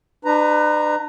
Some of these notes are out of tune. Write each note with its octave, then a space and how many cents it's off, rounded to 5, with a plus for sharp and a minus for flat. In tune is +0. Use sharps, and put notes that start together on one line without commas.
D4 +40 B4 +25 A#5 +0